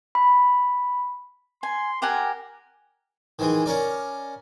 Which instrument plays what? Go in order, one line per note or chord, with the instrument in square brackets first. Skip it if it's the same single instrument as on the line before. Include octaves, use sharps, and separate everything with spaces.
[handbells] B5
[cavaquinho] G#5 [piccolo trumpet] C6
[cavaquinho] G4 F#5 G#5 [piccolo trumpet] A#4
[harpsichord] D#3 E3 G#3
C#4 A#4 D5